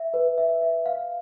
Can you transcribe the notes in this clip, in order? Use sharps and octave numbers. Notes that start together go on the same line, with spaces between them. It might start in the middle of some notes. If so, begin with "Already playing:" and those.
Already playing: E5
B4
E5
E5
F5